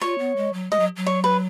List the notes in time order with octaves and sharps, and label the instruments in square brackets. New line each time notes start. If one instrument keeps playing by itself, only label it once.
[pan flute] F4 [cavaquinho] C#5
[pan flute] B3
G#3
F#3
[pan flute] G#3 [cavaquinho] D#5
[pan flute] F#3
F#3
[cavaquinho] C#5
B4